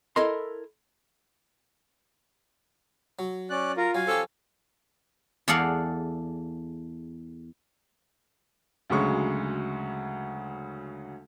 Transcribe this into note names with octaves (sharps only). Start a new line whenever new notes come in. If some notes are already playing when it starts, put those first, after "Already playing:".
E4 A4 A#4 D#5 C6
F#3
C#4 D5 F#6
F4 A#4
F#3 F5 G#5
F3 C#4 G4 A4
E2 G#4 A4 D5 F5 F#5
D2 C#3 F#3 G#3 C#6